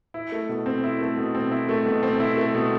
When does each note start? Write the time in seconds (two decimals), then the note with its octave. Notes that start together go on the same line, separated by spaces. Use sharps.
0.14 E4
0.32 A3
0.49 B2
0.66 C4
0.84 E4
1.01 A3
1.17 B2
1.35 C4
1.52 E4
1.69 A3
1.86 B2
2.03 C4
2.20 E4
2.37 A3
2.54 B2